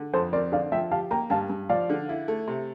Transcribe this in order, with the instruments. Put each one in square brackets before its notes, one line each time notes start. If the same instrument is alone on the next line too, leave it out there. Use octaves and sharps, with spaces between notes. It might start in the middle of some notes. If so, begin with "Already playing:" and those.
Already playing: [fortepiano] D3
[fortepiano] F2 [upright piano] A4 C5
[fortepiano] C4 [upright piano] A#4 D5
[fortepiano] D3 [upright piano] D5 F5
[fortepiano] F3 [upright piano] E5 G5
[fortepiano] G4 [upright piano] F5 A5
[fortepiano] A#3 [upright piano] G5 A#5
[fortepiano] G2 [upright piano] F5 A5
[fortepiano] G2
[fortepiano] F3 [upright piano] D5 F5
[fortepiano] D3
E4
A3
C3